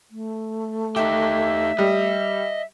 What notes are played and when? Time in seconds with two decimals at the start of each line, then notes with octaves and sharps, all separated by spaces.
0.11 A3
0.96 D#4 G4 E5
1.79 G3 D#5